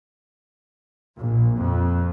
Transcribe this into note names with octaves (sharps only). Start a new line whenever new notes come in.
A#1
F2